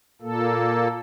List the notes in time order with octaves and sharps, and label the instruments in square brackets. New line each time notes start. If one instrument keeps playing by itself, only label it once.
[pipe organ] A#2 A#3 A4